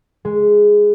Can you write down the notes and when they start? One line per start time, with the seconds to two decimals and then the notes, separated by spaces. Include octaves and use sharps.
0.25 G#3